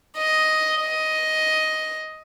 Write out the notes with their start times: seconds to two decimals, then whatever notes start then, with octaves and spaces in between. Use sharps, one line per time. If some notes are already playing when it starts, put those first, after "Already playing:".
0.17 D#5
0.81 D#5